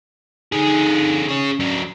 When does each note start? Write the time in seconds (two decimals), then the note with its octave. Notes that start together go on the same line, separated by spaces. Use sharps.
0.52 D3 D#4 G#4
1.28 C#4 G#4 C#5
1.60 F#3 D4